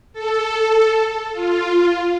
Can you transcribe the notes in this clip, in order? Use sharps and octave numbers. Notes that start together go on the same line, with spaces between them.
A4
F4